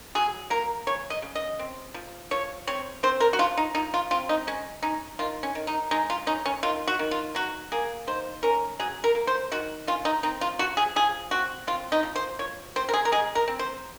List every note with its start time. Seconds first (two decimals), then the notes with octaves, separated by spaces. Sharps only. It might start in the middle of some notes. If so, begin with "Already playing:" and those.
0.15 F#3 G#4
0.50 A#3 A#4
0.87 C#3 C#5
1.10 D#5
1.22 C#3
1.35 D#5
1.59 C4
1.94 F3
2.31 F3 C#5
2.67 C4 C#5
3.03 C4 C5
3.20 A#4
3.33 F#4
3.39 F3 F4
3.57 D#4
3.75 F3 D#4
3.94 F4
4.11 C4 F4
4.29 D#4
4.47 G#3 C#4
4.83 C#4 D#4
5.19 D#3 F4
5.43 C#4
5.55 D#3
5.67 D#4
5.91 G#3 D#4
6.10 F4
6.27 C#4 D#4
6.46 C#4
6.63 D#3 F4
6.87 F#4
6.99 D#3
7.11 F4
7.35 F#3 F#4
7.72 A#3 G#4
8.07 D#3 C5
8.43 C#4 A#4
8.79 F#3 G#4
9.04 A#4
9.15 A#3
9.27 C5
9.52 D#3 F#4
9.87 C#4 F4
10.05 D#4
10.23 C4 D#4
10.41 F4
10.59 F3 F#4
10.77 G#4
10.96 F3 G#4
11.31 C4 F#4
11.67 C4 F4
11.92 D#4
12.03 F3
12.16 C5
12.39 F3 C#5
12.76 C4 C5
12.89 A#4
12.93 G#4
13.05 A#4
13.12 G#3 G#4
13.35 A#4
13.48 C4
13.59 C5